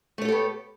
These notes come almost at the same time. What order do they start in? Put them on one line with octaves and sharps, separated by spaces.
A3 C#5 A4 G4 B3